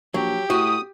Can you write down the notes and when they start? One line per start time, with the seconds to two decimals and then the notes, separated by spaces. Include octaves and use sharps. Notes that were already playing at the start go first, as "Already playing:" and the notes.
0.14 A#1 F#3 G4
0.50 A2 F#4 D#6